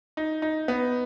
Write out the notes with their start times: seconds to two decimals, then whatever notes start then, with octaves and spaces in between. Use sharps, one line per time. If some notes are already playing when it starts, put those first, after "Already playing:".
0.17 D#4
0.42 D#4
0.68 B3